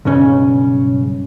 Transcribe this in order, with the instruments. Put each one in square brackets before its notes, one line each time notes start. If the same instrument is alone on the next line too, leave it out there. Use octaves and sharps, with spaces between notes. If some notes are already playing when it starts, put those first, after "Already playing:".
[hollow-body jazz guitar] B1 G2 C#3 C#4